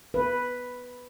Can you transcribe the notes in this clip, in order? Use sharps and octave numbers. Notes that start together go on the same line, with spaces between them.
B4